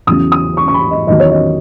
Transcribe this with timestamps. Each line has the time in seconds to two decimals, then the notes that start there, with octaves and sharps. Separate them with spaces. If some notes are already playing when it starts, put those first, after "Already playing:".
0.07 E2 C#3 F#3 D#6
0.32 D#6
0.57 C#6
0.68 C#6
0.74 B5
0.91 D#5
1.07 E2 D#3 F#3 D#5
1.20 C#5
1.31 D#5